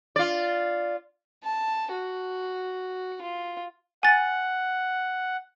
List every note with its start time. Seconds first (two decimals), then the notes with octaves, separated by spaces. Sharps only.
0.16 F4 D5
1.43 A5
1.91 F#4
3.22 F4
4.03 F#5 G#5 A6